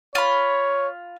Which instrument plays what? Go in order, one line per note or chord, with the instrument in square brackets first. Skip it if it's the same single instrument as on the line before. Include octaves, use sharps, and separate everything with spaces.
[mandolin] F4 B5 [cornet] C#5